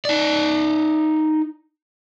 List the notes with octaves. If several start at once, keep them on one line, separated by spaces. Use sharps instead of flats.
D#4 D5